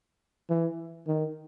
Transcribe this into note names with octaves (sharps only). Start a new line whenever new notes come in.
E3
D#3